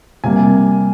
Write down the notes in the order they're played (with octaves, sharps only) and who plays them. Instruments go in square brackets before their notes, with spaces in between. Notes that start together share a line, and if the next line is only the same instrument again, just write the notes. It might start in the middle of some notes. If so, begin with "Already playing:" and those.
[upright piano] C3 G3 A#3 G#5